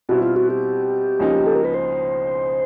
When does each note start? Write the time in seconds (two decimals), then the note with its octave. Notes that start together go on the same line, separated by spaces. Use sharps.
0.09 B2 G3 C4 E4 F#4
0.22 F4
0.36 F#4
0.50 G4
1.19 C#2 C#3 F3 A#3 D#4
1.46 A4
1.55 A#4
1.65 B4
1.74 C5